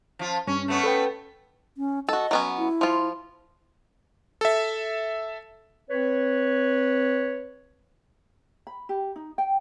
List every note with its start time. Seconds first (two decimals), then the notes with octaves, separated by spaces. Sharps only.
0.19 F3 F4
0.47 G2 C#4
0.68 A3 B3 C#4
0.84 A4 B4 G5
1.77 C#4
2.09 F#4 A4 D#5
2.31 F#3 B3 C#4
2.58 E4
2.81 F3 F4
4.41 A4 E5
5.90 C4 B4 C#5
8.67 B5
8.89 G4
9.16 D#4
9.38 G5